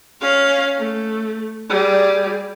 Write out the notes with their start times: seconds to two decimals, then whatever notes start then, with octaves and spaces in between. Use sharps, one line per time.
0.21 C#4 F5
0.79 A3
1.70 G3 G#4